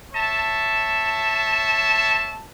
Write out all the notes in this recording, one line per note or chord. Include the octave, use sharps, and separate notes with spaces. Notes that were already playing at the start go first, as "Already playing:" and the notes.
C#5 E5 A5